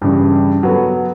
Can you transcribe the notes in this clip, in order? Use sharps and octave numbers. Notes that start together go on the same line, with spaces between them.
G2 C#3 E3
F#3 B3 A4